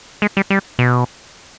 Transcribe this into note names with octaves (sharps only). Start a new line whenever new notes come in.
G#3
G3
G3
B2